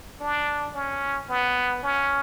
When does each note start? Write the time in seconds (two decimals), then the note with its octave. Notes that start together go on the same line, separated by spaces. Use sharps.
0.20 D4
0.75 C#4
1.30 B3
1.83 C#4